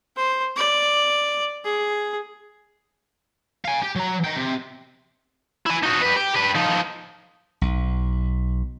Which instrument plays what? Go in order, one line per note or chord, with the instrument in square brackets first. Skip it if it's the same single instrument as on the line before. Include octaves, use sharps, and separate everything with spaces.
[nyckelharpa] C5
D5
G#4
[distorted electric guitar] F5 G#5
G4
F#3 A#5
D#5 G5
C3
E4 G#5
D#4 F#4
G4 B4
G4
G4 B4
F3 D#4
[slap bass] B1